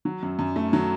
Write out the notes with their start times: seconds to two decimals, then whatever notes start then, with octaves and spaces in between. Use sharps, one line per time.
0.05 F#3
0.23 F#2
0.39 F#2
0.56 A3
0.73 F#3